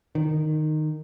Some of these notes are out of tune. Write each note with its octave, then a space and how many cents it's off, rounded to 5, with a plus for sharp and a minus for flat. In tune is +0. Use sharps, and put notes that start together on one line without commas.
D#3 -15